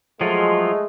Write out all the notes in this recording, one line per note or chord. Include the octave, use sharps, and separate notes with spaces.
F3 F#3 G#3 A3 F4